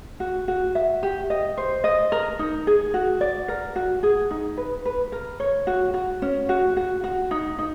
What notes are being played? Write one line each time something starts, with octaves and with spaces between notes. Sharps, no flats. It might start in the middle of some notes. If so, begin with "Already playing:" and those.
F#4
F#4
E5
G4
D#5
C5
D#5
A#4
D#4
G#4
F#4
D5
A#4
F#4
G#4
D#4
B4
B4
A#4
C#5
F#4
F#4
C#4
F#4
F#4
F#4
D#4
D#4